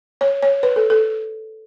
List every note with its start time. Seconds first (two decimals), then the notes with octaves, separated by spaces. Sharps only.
0.21 C#5
0.42 C#5
0.63 B4
0.76 A4
0.90 A4